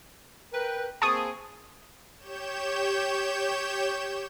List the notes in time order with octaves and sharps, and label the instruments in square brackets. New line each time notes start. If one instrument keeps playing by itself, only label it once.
[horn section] A#4 B4 G5
[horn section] A#3 C4 G#4 [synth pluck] A5 C#6 D#6
[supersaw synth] G4 C#5 G6 E7